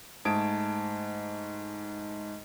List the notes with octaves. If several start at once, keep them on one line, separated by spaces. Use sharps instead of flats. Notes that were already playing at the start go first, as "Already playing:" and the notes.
G#2 A3 A5 D#6 G#6 D7